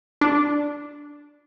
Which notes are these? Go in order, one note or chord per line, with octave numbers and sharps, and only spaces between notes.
D4